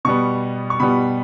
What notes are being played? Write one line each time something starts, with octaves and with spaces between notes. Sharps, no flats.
B2 G3 B3 C#6
C#6
B2 G3 B3 B5